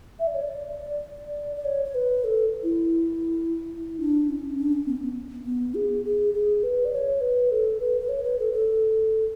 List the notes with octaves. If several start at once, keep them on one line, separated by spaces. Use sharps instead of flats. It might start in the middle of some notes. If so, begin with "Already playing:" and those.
E5
D5
C#5
D5
D5
C#5
C#5
B4
A4
E4
D4
C#4
D4
C#4
B3
C#4
B3
B3
G#4
G#4
G#4
B4
D5
C#5
B4
A4
B4
B4
C#5
B4
A4
A4